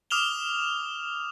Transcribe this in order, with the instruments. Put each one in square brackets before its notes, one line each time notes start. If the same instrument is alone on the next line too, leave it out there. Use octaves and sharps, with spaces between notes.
[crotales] D6 D#6 F6 E7 F7 G7